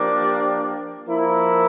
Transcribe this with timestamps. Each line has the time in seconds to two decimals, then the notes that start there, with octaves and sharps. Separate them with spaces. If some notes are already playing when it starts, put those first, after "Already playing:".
Already playing: F3 A#3 D4 G4 D5
1.05 F3 A#3 E4 A#4